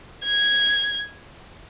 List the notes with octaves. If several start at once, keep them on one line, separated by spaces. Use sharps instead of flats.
G#6